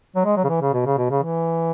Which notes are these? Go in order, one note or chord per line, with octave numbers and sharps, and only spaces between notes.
F#3
G#3
F#3
C#3
E3
C#3
B2
C#3
B2
C#3
E3